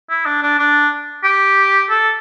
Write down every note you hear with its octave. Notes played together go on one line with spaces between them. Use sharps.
E4
D4
D4
D4
G4
A4